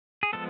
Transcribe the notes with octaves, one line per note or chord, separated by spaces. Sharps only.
G#4
F3 G#3 B3 A4